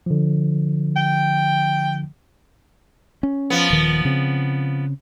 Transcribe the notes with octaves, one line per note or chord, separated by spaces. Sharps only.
D3 F3
G5
C#4
F3 B3
D#1 D#3
C#3 C4